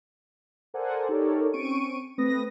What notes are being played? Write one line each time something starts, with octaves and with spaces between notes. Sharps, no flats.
A4 A#4 C5 D5 F#5 G#5
D#4 G4 A4 A#4 C#5 D5
C4 C#4 C#6 D7 D#7
A3 C4 B4 D#6 A#6